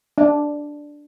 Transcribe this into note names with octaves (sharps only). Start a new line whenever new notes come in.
D4